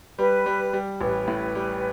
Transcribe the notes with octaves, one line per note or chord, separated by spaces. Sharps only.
G3 B4
G3
G3
A1 B4
A2
G3